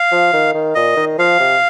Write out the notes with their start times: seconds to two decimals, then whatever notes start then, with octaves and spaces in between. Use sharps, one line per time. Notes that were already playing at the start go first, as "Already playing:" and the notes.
Already playing: F5
0.12 F3
0.33 D#3
0.54 D#3
0.75 A#2 D#5
0.97 D#3
1.18 F3 F5
1.40 C3